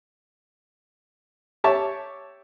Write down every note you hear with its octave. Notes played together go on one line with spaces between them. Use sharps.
G4 C#5 E5 A5 C#6 D6